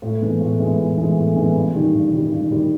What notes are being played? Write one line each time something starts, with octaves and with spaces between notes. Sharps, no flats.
A2
E3 G#3 B3
A2
E3 G#3 B3
A2
E3 G#3 B3
A2
E3 G#3 B3
G2
D#3 G3
G2
D#3 G3
G2
D#3 G3